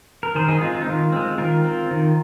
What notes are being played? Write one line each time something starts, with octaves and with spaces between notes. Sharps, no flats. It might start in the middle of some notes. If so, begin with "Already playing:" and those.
A#4
D#3 G#4 C5
D#4 G#4
G#3 C4 F4
F4
D#4
D#3 F4
G#3 C4
D#3 F4 A#4
C4
D#3